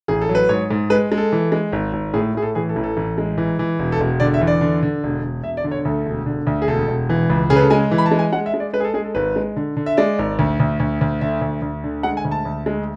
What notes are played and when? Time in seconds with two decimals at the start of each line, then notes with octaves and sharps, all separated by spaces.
0.08 A1 G#4
0.21 A4
0.29 F#3
0.35 B4
0.49 G#2 C#5
0.71 G#2
0.90 G#3 B4
1.12 G#3
1.17 A4
1.32 E3
1.52 G#3
1.72 G#1
1.93 G#1
2.14 A2 G#4
2.34 A2 G#4
2.42 A4
2.55 E3 G#4
2.69 A4
2.76 A1
2.84 A4
2.97 A1
3.18 G#3
3.38 E3
3.59 E3
3.79 E1
3.92 A4
4.00 E1
4.20 D3 D5
4.34 E5
4.41 E2
4.47 D5
4.61 D3
4.83 D3
5.03 E1
5.23 E1
5.43 E1 E5
5.57 D5
5.64 D3
5.71 C#5
5.85 D2 A4
6.06 E1
6.26 D3
6.47 D2
6.62 G#4
6.68 E1 A4
6.88 E1
7.09 E3
7.30 C#2
7.50 C#3 G#4
7.56 B4
7.60 A4
7.70 G#3 G#5
7.91 E3
7.98 B5
8.06 A5
8.11 G#3
8.19 G#5
8.32 G#3 F#5
8.46 E5
8.54 G#3
8.60 D5
8.73 G#3 B4
8.80 G#4
8.84 A4
8.94 G#3 G#4
9.04 A4
9.15 G#1 B4
9.36 G#3
9.56 D3
9.77 D3
9.86 E5
9.97 G#3 D5
10.19 G#1
10.39 D2
10.60 D2
10.80 D2
11.01 D2
11.21 D3 E5
11.41 D2
11.62 D2
11.84 D3
12.03 G#3 F#5
12.17 G#5
12.25 D2
12.31 A5
12.45 D2
12.66 G#3